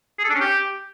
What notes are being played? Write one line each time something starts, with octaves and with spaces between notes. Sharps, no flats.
G#4
A4
D4
C#4
G4